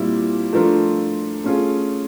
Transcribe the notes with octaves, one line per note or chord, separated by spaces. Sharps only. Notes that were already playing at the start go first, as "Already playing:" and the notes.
Already playing: A#2 G3 C4 E4
F3 A3 D4 F4 A#4
A3 C#4 F4 G#4